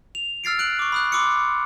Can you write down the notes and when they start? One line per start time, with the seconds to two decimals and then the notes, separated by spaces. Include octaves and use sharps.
0.15 F7
0.44 E6 F6 A6 C7 D7
0.59 F#6 D7 F#7
0.79 C#6 D6
0.92 B5 D#6 F#6
1.12 B5 C6 D6 E6 C#7